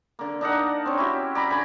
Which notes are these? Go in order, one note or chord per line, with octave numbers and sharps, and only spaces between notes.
D3 A#3
D4 D#4 A#4 F#5
C4 C#4
E4 F#4 G4
D5 A#5 B5
D3 G#5 B5